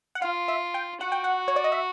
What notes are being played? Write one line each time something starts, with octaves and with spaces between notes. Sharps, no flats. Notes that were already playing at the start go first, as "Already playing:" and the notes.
F#5
F4 F5
E5
G5
F#4 F#5
G5
F#5
C#5
D5
D#5
E5